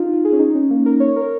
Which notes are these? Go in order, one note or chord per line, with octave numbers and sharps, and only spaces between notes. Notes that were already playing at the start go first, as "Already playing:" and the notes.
Already playing: D#4 F4
F4
G#4
C#4
D#4
C#4
A#3
A#4
C#5
A#4